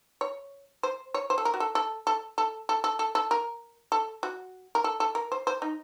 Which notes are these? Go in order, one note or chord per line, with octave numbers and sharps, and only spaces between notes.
C#5
C5
C#5
C5
A4
A#4
F#4
A4
A4
A4
A4
A4
A4
A4
A4
A#4
A4
F#4
A#4
A4
A4
A#4
C5
C5
D#4